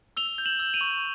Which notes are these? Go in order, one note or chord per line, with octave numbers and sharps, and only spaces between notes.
E6 F7 G7
G6
E7 F#7
E6
D#7 F7
C#6